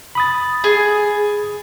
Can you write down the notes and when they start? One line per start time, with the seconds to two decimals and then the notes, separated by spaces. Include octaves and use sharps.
0.15 B5 D#6 A6
0.64 G#4